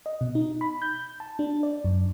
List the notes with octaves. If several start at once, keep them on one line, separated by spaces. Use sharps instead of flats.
D#5
B2
D#4
B5
G6
A5
D4
D5
F#2